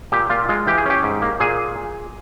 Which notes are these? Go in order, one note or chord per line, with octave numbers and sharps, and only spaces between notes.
A#2 G4
A#2 F4
G#3 F4
E3 G4
G#4
C#4 G4
G#2
A#3
A#2 G#4